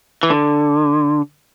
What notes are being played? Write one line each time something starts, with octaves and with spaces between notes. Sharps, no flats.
E3
D3